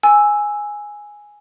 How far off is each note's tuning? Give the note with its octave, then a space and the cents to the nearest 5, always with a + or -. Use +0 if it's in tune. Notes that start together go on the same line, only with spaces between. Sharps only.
G#5 +0 E6 +0